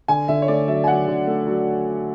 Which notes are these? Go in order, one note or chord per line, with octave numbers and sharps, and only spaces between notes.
D3 G#5
D3 E5
C#5
A3 D5
F#3 E5
G#5
F#3 F#5
D3
A3
F#3